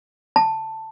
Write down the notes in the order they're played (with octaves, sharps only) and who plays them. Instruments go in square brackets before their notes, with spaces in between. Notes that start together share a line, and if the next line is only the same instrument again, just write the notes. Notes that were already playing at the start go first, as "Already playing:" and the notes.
[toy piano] A5